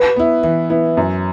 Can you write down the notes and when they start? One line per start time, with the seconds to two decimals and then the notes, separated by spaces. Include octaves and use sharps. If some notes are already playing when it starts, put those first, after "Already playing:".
Already playing: B4
0.16 B3 E4
0.44 E3
0.70 B3 E4
0.97 F#2